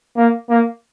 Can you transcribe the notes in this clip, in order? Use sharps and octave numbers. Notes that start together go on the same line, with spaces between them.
A#3
A#3